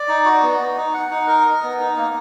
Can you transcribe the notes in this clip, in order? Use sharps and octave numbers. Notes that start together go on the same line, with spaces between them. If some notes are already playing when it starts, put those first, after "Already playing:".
Already playing: D5
D#4
F#4
B3
B3
D#4
F#5
D#4
A#4
D#5
B3
D#4
A#3